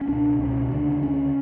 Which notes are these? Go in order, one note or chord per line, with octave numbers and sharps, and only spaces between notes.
C#4
C#2 B2 D4
C#2 B2 C#4
D2 C#3 D4
D4
D2 C#3 C#4